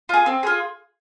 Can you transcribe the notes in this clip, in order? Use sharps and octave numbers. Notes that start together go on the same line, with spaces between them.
F4 G#4
C4
F4 G#4